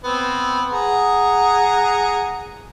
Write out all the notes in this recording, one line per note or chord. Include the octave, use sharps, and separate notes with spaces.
B3 C4
G#4 F#5 A#5